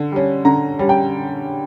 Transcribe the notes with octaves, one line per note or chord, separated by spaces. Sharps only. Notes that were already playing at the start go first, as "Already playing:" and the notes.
Already playing: D3
G3 C#4
D3 A#5
G3 C#4
G5